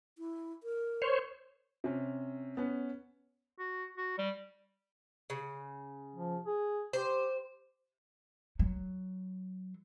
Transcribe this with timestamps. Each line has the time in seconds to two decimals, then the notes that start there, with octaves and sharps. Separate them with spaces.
0.18 E4
0.63 A#4
1.02 C5 C#5
1.84 C3 C#4
2.57 B3 C#4
3.59 F#4
3.97 F#4
4.18 G3
5.30 C#3
6.16 F3
6.46 G#4
6.93 G4 C5
8.59 F#3